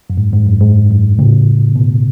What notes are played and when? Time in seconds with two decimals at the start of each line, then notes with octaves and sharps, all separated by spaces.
0.10 F#2
0.18 G#2
0.33 G#2
0.47 F#2
0.61 G#2
0.90 F#2
1.19 A2 C#3
1.76 B2